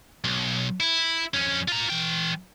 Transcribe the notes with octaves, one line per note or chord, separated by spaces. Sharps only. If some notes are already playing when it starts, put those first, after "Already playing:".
B1
E4
F2 C#4
F4 A#5
E3 G5